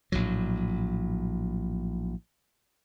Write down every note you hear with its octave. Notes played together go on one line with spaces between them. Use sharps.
A#1 A2 F#3